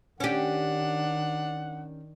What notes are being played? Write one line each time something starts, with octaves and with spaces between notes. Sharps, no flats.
D#3 C#4 D4 G4 F#5